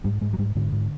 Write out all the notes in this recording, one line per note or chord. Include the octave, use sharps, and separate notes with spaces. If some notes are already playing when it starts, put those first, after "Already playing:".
G#2 G3
G#2 G#3
F#3
G#2 G3
G#2 D3
G#2